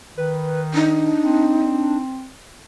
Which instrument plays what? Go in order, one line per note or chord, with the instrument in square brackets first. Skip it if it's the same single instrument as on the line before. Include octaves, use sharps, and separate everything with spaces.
[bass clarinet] D#3 [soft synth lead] B4
[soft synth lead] D4 [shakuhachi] D#4
[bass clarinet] C4